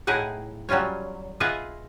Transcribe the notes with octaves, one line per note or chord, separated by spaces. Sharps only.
A2 D#4 E4 G#4 F#5
F#3 G3 C#4 F4 C#5
F4 G#4 B4 D#5 E5 F#5